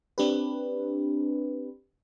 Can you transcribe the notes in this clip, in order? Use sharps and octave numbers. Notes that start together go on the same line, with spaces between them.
C4 D4 G4 B4